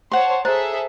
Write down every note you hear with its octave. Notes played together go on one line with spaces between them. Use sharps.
C5 C#5 F#5 A5 C6
G#4 A4 C5 E5 A5 A#5